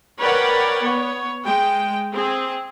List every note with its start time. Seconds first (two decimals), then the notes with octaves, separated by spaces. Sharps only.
0.20 A#4 B4 C#5 D5 F#5 G5
0.81 B3 C#5
1.45 G#3 G5
2.12 C4 G#4